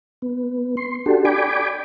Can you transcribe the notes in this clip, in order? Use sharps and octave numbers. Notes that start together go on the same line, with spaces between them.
B3
C6
D4 F#4 G4 A4
D5 G5 G#5 B5 D6